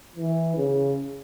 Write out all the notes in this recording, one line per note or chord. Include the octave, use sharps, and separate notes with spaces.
E3
C#3